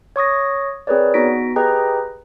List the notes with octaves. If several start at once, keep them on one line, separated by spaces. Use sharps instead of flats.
C#5 C#6 D#6 A#6
C4 G#4 A#4 B4 C#5 D5
B3 D#4 F#4 A#6 B6 D7
G4 G#4 B4 D#5 G5 A#5